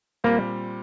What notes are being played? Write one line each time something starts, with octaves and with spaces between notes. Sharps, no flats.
A#2 G3 A#3 C4